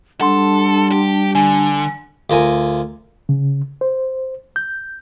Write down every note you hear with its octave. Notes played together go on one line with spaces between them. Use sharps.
G3 D4 A4 F#5 C6
G4
D3 G#5
D2 F4 A#4 G#5
C#3
C5
G6